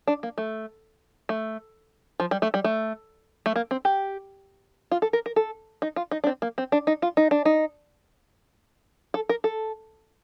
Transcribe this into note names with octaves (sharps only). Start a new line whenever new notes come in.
D4
A#3
A3
A3
F3
G3
A3
G3
A3
A3
A#3
C4
G4
F4
A4
A#4
A#4
A4
D#4
F4
D#4
D4
C4
A#3
C4
D4
D#4
F4
D#4
D4
D#4
A4
A#4
A4